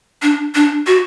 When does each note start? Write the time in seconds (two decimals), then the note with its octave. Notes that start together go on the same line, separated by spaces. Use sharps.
0.22 D4
0.55 D4
0.87 F#4